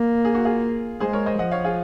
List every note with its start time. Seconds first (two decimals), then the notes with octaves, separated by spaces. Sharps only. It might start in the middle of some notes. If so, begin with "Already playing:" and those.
Already playing: A#3
0.25 G#4
0.35 F#4
0.45 F4 G#4
1.00 G#3 G#4 C5
1.13 A#4 C#5
1.26 C5 D#5
1.39 F3 D#5 F#5
1.51 C#5 F5
1.64 F4 G#4